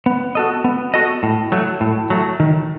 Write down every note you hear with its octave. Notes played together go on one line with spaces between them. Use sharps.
B3
F#4 A4 D#5
B3
F#4 A4 D#5
A2
F#3 A3
A2
F#3 A3
D#3